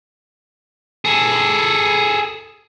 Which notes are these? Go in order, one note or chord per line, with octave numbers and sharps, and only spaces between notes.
G#4 A4